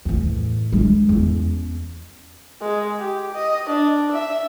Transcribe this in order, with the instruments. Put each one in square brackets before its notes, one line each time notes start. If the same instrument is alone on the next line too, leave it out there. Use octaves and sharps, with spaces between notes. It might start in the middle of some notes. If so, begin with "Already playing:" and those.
[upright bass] E2 A2
G#3 D4
E2 C#4
[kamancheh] G#3
G4
D#5
D4
E5